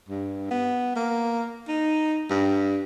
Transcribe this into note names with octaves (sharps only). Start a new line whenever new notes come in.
G2
B3
A#3
D#4
G2